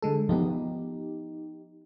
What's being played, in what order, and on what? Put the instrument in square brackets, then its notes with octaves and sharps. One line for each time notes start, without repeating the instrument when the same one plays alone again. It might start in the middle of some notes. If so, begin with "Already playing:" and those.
[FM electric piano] D3 G#3 A4
[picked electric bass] F3 B3 [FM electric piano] D#4 G4